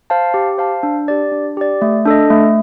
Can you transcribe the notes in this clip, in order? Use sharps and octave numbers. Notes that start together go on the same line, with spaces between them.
C5 F5 A5
G4
C5 F5 A5
D4
G4 D5
D4
G4 D5
A3
D4 A4 D#5
A3